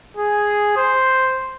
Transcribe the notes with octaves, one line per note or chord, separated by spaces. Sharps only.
G#4
C5